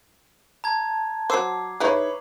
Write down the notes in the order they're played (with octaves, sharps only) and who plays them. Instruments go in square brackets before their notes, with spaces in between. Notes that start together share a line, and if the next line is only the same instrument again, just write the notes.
[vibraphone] A5 [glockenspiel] A#5 G#6
[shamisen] F#3 C5 [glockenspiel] D6 E6 C7
[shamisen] D#4 E4 G#4 [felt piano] B4 C#5